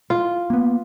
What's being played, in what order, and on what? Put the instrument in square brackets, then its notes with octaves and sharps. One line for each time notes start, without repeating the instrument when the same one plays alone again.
[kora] F4
[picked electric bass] A#3 B3